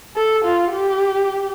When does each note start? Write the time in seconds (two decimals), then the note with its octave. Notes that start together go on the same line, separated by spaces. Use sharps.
0.16 A4
0.44 F4
0.72 G4